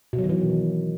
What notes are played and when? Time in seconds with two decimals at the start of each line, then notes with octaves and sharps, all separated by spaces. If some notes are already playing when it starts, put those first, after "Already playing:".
0.13 B2
0.19 F#3
0.24 D#3
0.29 E3